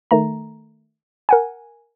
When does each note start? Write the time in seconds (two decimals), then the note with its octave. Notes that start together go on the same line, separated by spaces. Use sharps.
0.11 D#3 A3 A#5
1.29 A#4 F#5 G#5